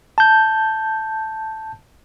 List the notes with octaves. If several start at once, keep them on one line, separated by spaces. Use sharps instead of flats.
A5 G6